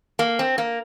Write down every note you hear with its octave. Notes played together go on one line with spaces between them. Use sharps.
A#3
C4
A#3